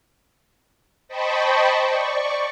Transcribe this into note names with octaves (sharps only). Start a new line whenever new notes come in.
C5 D#5 G5 A5 B5 C#6
D5 C#6